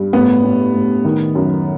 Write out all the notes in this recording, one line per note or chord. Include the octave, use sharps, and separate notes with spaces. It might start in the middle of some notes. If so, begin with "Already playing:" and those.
Already playing: G2
A2 B3
A2
A2
D#3
F#2